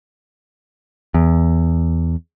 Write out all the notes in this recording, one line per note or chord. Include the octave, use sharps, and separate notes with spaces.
E2